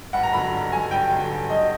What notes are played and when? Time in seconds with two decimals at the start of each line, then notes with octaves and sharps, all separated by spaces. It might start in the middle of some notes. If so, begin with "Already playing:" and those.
0.13 G2 F#5
0.23 A#5
0.33 D3 F#3 B5
0.44 A#5
0.52 G2
0.72 D3 F#3 G#5
0.91 G2 G5
1.10 D3 F#3
1.30 G2
1.50 D3 F#3 D#5